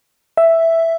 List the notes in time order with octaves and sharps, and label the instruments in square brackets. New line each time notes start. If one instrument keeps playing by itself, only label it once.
[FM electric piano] E5